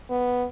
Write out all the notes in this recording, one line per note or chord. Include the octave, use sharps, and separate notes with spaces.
B3